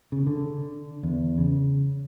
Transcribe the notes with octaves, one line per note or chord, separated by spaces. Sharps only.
C#3
D3
E2
C#3